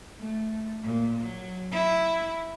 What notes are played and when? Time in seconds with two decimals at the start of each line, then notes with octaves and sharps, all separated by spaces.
0.20 A3
0.84 A#2
1.21 F#3
1.72 E4